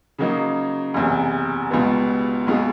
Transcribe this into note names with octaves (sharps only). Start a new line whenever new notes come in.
C#3 F#3 A#3 D#4
F#1 E2 C3
C#2 B2 G3 B3
B1 B2 G#3